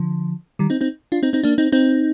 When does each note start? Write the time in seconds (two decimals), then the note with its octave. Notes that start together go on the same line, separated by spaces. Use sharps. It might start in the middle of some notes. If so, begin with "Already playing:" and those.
Already playing: D3 F3
0.59 D#3 G3
0.70 C4 D#4
0.81 C4 D#4
1.12 D4 F4
1.23 C4 D#4
1.33 C4 D#4
1.43 A#3 D4
1.58 C4 D#4
1.72 C4 D#4